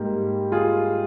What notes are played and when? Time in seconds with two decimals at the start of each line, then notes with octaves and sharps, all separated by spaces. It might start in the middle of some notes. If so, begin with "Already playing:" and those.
Already playing: G#2 G3 A#3
0.52 F4 G#4